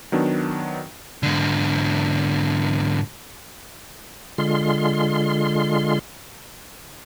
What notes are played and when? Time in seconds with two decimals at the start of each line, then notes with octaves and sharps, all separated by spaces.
0.12 D#3 F#3 B3 D4
1.23 G#2 D3
4.38 D3 G#3 F4 C6